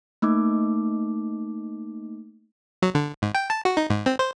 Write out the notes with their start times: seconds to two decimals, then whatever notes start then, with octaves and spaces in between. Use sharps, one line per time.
0.22 A3 A#3 D#4 D6
2.82 F#3
2.95 D3
3.22 G#2
3.35 G5
3.50 A5
3.65 F#4
3.77 D#4
3.90 G#2
4.06 C4
4.19 C5